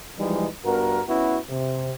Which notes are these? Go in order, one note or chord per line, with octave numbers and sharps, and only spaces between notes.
E3 F3 G3 G#3 D#4
G2 B3 F#4 A#4
B3 C#4 E4 F#4
C3